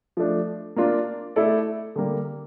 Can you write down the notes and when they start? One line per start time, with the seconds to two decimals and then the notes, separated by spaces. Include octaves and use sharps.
0.17 F3 A3 D4
0.76 A#3 D4 F4
1.36 A3 E4 A4 D5
1.96 D3 G3 A#3